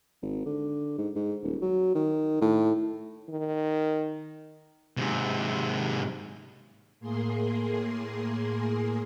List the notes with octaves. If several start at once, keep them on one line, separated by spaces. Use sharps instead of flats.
G#1
D3
G#2
G#2
D#1
F#3
D#3
A2
D#3
G#2 C3
A2 A#3 G#4 C6